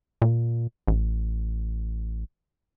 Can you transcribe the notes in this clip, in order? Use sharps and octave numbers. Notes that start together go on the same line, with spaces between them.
A#2
A1